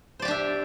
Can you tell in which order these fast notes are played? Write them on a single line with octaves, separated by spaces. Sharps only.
C5 D5 G4 D4 E5